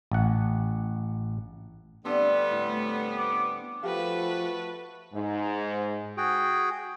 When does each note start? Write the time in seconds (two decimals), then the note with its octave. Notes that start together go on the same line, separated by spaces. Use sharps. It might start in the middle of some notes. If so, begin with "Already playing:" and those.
0.12 A1 F#5
2.05 D3 G3 B3 C4 D4 E5
2.50 A2
3.18 D6
3.83 F3 A3 F#4 G4 A4 B4 F5 C#6
5.13 G#2
6.17 F#4 G#4 G5